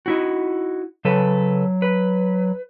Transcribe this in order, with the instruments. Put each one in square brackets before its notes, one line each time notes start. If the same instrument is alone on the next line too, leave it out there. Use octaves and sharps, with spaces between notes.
[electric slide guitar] D#4 E4 F#4
[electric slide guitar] C#3 A4 B4 [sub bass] F#3
[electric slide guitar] B4